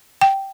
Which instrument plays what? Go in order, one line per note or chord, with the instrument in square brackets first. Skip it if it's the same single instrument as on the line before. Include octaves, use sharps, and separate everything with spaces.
[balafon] G5